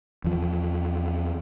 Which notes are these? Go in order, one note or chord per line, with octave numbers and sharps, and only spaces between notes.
E2 F3